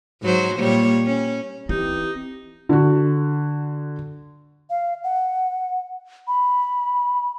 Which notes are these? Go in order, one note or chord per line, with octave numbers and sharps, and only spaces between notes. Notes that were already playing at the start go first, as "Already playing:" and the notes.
G#2 F#3 C5
A#2 G3 C#5
C#4
E3 C4 D#4 G4
D3 F#4
F5
F#5
B5